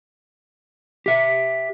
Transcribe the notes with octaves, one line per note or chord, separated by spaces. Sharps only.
G4 E5